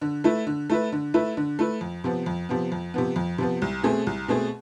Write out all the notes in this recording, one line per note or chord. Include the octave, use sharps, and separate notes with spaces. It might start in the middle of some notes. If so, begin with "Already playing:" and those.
D3
A3 E4 B4
D3
A3 E4 B4
D3
A3 E4 B4
D3
A3 E4 B4
F2
C3 F3 B3
F2
C3 F3 B3
F2
C3 F3 B3
F2
C3 F3 B3
C2
B2 A3 C4 G#4
C2
B2 A3 C4 G#4